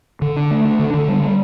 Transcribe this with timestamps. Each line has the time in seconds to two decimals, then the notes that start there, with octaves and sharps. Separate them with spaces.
0.22 D3
0.36 D4
0.51 A3
0.65 D4
0.79 D3
0.94 D3
1.08 G3
1.23 G3